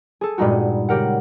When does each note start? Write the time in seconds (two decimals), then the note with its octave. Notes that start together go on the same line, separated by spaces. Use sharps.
0.21 G#4 A4
0.38 G2 A#2 G#3 D#4 F#4
0.89 C#3 G4 A#4 F#5